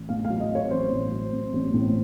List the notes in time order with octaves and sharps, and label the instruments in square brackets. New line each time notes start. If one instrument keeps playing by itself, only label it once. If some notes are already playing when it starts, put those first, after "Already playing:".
Already playing: [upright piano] A1
A2 F5
F5
F#3
D#5
C4 C#5
A1 C5
A2
F#3
C4
A1
A2